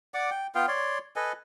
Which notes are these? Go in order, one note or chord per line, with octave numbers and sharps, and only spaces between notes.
D5 F#5 D6
G5
B3 F4 F5 G5
C#5 D5 C6
A4 B4 D#5 G#5